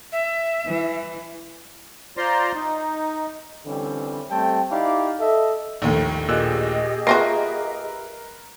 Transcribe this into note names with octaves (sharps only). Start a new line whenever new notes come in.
E5
E3
F4 C5 D5 A#5 C6
D#4
D3 E3 G3 C4 C#4
G3 A3 C4 G5 A5
D#4 E4 G4 D5 F5
A4 D#5 E5
A#1 D#2 A2
A#2 G4 G#4 D#5 E6 F#6
A#3 F4 F#4 A#4 B4 E5 A#6 C7